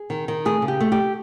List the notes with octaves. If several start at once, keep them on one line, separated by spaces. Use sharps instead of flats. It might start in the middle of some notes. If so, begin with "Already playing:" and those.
Already playing: G#4
D#3
D#3
A3 G#4
C#3
G4
A3
G4